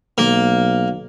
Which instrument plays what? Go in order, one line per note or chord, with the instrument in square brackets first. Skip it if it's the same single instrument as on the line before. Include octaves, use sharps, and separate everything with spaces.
[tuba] B1 [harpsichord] A#3